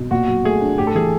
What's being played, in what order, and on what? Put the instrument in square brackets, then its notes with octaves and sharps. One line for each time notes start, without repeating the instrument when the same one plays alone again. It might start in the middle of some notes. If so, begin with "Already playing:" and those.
Already playing: [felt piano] B2
[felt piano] A#2 [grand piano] F#4
[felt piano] F#3
[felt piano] A3 [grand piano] G#4
[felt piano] D4
[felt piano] A2 [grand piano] G4
[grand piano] A4
[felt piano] E3 [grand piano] G#4